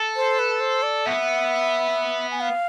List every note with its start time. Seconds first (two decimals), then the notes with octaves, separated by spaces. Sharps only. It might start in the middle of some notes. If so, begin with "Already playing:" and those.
Already playing: A4
0.16 C5
0.39 B4
0.60 C5
0.83 D5
1.06 B3 E5
2.31 G#5
2.40 F5